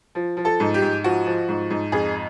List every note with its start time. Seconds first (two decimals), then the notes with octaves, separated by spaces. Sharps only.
0.15 F3
0.37 F3
0.45 A4
0.60 G#2
0.74 G4
0.82 G#2
1.04 F3 F#4
1.26 F3
1.48 G#2
1.70 G#2
1.92 F2 G#4